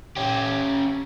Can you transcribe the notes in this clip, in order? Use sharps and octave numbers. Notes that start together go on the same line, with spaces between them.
C#4 G4